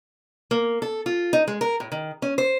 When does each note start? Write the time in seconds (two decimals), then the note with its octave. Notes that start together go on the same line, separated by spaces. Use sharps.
0.51 A#3
0.82 A4
1.06 F4
1.33 D#4
1.48 G#3
1.61 A#4
1.80 A2
1.92 D#3
2.22 C#4
2.38 C5